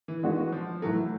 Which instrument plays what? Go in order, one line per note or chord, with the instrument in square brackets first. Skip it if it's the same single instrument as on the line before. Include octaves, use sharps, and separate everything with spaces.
[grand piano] E3
[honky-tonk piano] D#3 G#3 B3 D4 F#4
[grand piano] F3
[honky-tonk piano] A2 E3 A3 [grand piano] F#3